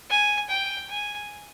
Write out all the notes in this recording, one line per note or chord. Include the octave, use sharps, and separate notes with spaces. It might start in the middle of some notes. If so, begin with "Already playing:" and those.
G#5
G5
G#5